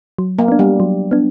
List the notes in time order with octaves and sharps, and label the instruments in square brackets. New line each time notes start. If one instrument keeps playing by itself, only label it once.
[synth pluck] F#3
[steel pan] A#3
[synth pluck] B3 D4
[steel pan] G3
[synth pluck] F#3
B3 D4